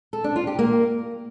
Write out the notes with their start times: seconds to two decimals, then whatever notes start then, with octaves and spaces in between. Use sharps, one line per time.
0.13 A4
0.24 D4
0.36 F4
0.47 G4
0.59 A#3